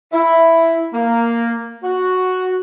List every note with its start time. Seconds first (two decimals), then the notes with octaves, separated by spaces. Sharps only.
0.13 E4
0.93 A#3
1.84 F#4